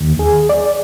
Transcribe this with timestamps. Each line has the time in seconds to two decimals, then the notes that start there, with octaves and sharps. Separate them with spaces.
0.01 D#2
0.19 G#4
0.49 D5